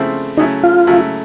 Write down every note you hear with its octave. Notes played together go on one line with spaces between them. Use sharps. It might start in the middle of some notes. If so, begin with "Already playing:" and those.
Already playing: C#3 F3 A3 C4 E4
C#3 F#3 A3 C#4 D#4 E4
F4
C#3 F#3 A3 C#4 E4